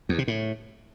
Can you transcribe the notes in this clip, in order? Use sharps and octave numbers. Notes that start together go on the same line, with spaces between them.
E2
C3
A2